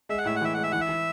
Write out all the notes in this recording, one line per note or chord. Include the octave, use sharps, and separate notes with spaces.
G#3 E5
F#5
A2 E5
F#5
E3 E5
G#3 F#5
E5
E3 F#5
E5
E3